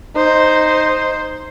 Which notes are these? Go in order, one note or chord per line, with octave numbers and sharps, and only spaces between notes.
D#4 C5